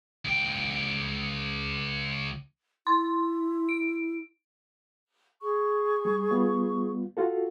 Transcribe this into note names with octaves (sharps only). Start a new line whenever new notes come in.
C#2 G5
E4 C6
D7
G#4 C#6
G3
G3 B3 F4
F4 F#4 A4